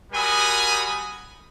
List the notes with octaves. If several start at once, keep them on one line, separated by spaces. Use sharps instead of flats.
G3 F#4 A#4 G#5 B5 D#6